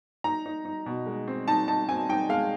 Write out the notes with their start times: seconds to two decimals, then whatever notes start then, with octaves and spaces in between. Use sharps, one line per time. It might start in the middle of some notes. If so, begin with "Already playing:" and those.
0.24 D#4 A#5
0.46 D#4
0.65 D#4
0.86 B2
1.06 G#3
1.28 C4
1.48 D#4 A5
1.68 D#4 A5
1.89 C4 G#5
2.09 D#4 G5
2.29 G#3 F5